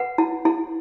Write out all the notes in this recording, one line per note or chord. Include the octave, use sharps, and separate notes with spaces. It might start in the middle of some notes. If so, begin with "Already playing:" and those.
Already playing: B4 F#5
E4
E4